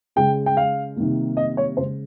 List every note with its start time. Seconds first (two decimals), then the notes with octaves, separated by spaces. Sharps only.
0.16 C#3 G#3 G5
0.46 G5
0.57 F5
0.96 C3 D#3 G3 A#3
1.37 D#5
1.57 C#5
1.77 C#3 G#3 C5